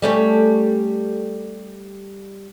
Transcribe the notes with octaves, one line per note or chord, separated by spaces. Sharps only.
G3 A3 C#4